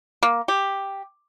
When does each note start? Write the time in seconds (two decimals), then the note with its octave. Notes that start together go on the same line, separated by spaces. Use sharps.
0.23 A#3
0.48 G4